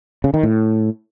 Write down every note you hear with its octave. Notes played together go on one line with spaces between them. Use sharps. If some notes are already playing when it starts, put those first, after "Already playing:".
C#3
D#3
A2